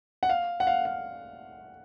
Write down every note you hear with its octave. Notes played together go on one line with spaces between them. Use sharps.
F#5
F5
F#5
F5
F5